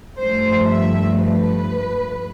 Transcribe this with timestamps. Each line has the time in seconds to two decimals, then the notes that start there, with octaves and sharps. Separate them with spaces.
0.20 G2 F3 A3 C5
0.66 E5
1.13 B4